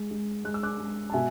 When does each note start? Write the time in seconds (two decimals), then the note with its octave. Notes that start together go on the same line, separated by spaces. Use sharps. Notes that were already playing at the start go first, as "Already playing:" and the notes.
Already playing: G#3
0.11 G#3
0.44 G#3 F#6
0.54 E6
0.63 D6 F#6
0.79 G#3
1.10 A5
1.14 B2 E5 G#5